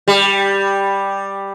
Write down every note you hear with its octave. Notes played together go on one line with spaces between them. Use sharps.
G3